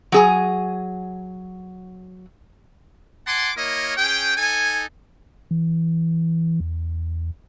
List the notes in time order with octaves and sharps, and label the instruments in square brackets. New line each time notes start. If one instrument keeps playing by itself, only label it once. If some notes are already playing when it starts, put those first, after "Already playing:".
[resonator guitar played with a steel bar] F#3 G#4 G#5
[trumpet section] F#5 G#5 A5 C6 D6
A#3 E4 A#4 C#5 D#5
C#4 G#4 G5
D#4 A4 G#5
[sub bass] E3
E2